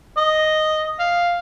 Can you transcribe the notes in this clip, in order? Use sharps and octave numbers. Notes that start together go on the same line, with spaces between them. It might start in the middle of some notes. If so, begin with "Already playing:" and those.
D#5
F5